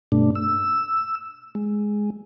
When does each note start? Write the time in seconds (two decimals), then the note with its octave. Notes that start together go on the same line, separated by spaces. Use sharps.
0.12 G2 B2 A3 D4
0.35 E6
1.55 G#3